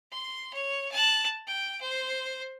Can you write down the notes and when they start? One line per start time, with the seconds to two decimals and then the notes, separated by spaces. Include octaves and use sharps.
0.11 C6
0.54 C#5
0.92 A5 F#6
1.47 G5
1.81 C5